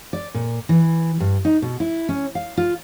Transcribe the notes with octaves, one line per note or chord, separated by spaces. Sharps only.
D5
A#2
E3
G2
D#4
B2
E4
C#4
F5
F4